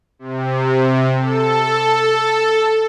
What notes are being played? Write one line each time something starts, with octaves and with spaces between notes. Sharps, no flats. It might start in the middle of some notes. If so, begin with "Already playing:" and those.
C3
A4